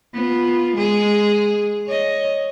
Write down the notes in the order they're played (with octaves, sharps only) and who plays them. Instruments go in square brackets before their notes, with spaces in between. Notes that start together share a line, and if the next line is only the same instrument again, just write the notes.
[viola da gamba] B3 F4
G#3 G#4
C#5 D#5